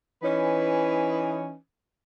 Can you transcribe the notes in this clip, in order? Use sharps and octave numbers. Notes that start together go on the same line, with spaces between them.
E3 C#4 D#4 B4